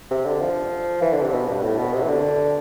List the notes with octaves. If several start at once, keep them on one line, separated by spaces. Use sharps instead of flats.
C3
D3
F3
E3
D3
C3
B2
G2
A2
B2
C3
E3
D3